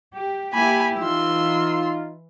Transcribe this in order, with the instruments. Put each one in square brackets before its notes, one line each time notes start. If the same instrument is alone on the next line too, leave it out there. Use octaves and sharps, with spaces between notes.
[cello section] G4
[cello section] A#3 E4 G4 [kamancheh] G#5 B5
[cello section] E3 [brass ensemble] D#4 F4 [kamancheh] C6 E6